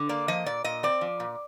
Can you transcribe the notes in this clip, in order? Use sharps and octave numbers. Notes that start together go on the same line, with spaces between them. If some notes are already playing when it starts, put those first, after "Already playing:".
Already playing: D3
A#3 D5
F3 D#5
A#2 D5
A#2 D#5
C4 D5
F3
A#2